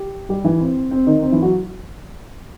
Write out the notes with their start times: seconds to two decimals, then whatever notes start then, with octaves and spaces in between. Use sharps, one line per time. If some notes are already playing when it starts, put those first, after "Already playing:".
Already playing: G4
0.29 G3 G4
0.44 E3 E4
0.60 C4
0.91 C4
1.06 D#3 D#4
1.22 C4
1.32 E3 E4
1.42 F#3 F#4